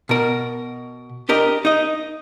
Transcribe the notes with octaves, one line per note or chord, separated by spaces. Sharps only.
B2 A#4
D4 G4 A#4 D#5
D#4 D#5